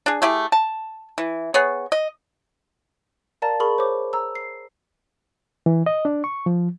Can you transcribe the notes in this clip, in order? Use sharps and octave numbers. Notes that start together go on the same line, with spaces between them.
D4 G#4
A3 E4 G4 G#4
A5
E3
B3 G#4 C#5
D#5
A#4 D5 F5 A5 A#5 A6
G#4 A#4 B5 C#6 F#7
C5 C#5 D6
A#5 E6
C7
E3
D#5
D4
C#6
F3